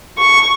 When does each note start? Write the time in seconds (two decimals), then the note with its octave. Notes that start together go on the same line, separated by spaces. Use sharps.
0.18 C#6